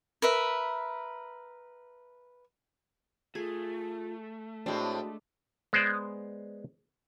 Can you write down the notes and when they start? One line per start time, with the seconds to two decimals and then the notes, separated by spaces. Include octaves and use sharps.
0.22 A#4 B4 E5
3.35 A3 F4 G#4
4.66 A2 G#3 C4 D4 F#4
5.73 G#3 B3 C5 D5